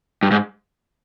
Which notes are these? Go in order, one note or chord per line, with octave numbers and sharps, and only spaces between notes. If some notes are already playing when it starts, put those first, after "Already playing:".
G2
G#2